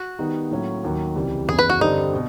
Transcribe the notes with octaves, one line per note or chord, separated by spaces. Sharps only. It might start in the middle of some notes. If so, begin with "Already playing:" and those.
Already playing: F#4
D#3 G3 B3 D#4
A2 F#3 A#3 C#4
D#2 D#3 F#3
C#2 C3 E3 G3
F#1 E2 C#3 G#4
B4
F#4
G2 D3 G3 C4 D#4
B2